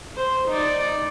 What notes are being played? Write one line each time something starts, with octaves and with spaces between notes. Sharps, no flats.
C5
D#4 D5